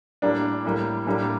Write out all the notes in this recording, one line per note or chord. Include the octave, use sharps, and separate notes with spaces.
A2 G3 A#3 D4
A2 G3 A#3
A2 G3 A#3 D4